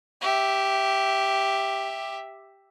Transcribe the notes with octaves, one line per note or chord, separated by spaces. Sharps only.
G4 E5